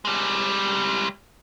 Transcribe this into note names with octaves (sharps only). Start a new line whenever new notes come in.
G3 G#3